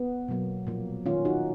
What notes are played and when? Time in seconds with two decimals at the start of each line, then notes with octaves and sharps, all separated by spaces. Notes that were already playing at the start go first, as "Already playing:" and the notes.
Already playing: B3
0.28 B2 F#3 A#3
0.67 A#2 F3 A#3
1.06 D#3 A#3 C#4 F4
1.25 D#4 F#4